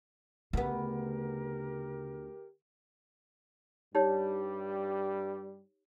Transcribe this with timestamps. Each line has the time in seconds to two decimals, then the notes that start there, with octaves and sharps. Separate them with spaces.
0.53 D2 C#3 B3 G4 A#4
3.95 G2 G3 D#4 G4 C#5